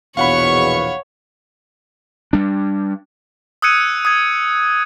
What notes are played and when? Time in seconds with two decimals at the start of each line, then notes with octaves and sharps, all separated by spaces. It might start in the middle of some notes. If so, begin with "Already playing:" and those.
0.17 A#1 E2 B2 C#5 F5 F#5 B5 C#6
2.33 G3 D4
3.62 D#6 E6 F#6 G#6 C#7 D#7
4.05 D#6 G#6